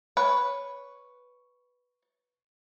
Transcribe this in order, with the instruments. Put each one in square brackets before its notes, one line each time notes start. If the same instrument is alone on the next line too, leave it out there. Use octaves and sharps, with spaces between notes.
[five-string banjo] B4 C#5